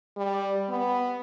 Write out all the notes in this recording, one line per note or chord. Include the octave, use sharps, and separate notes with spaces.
G3
B3